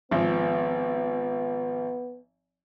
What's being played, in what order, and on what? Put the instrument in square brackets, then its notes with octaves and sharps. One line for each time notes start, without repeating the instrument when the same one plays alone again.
[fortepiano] G#1 F3 [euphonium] B3